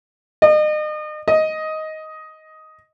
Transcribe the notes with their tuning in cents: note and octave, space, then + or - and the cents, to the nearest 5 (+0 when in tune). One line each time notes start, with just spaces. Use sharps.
D#5 -35
D#5 +10